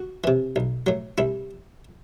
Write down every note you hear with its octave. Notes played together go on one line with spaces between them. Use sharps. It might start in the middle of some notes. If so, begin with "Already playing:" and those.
Already playing: F#4
C3 E3
B1
A2 F#3
C2 E4